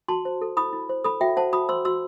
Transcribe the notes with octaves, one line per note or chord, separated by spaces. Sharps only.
F#4 A5 C6
C5
A4
E4 B5 D#6
E4
C5
A4 B5 D#6
F#4 E5 G5
C5 F#5 A5
F#4 B5 D#6
C5 C6 E6
F#4 C6 E6